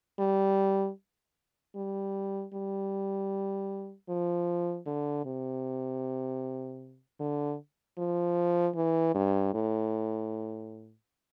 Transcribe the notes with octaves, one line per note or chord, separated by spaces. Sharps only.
G3
G3
G3
F3
D3
C3
D3
F3
E3
G2
A2